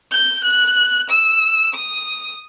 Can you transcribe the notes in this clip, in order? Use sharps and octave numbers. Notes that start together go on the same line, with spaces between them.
G6
F#6
E6
D#6